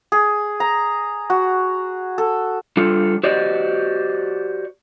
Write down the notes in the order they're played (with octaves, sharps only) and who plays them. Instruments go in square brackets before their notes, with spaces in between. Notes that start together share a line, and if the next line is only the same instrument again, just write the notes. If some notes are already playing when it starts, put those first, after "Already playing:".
[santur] G#4
A#5
F#4
A4
[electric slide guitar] G3 D4 F4 A4
F#4 G4 C5 D5 D#5